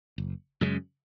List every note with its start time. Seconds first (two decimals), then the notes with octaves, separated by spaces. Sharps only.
0.18 F#1
0.61 F#2 C#3 G#3